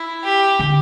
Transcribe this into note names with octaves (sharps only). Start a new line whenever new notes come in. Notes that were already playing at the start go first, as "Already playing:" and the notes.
Already playing: E4
G4
D3